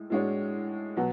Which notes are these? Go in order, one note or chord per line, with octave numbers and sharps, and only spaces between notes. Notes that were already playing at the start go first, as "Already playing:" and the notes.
Already playing: A2 G#3
A2 G#3 D4 F#4 C#5
B2 F#3